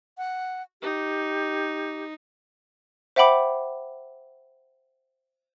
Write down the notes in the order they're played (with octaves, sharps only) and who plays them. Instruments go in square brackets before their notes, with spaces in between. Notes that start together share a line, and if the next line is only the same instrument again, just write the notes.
[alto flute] F#5
[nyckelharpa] D#4 [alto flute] G4
[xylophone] C5 E5 F#5 G5 B5 D6